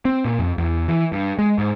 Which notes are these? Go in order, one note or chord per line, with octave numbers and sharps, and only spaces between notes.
C4
A#2
F2
E2
E3
G2
G#3
G#2